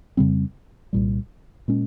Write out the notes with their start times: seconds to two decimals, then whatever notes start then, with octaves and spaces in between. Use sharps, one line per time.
0.17 F2 C#3 G3 C4
0.93 C2 A#2 G3
1.68 A#2 G#3 C#4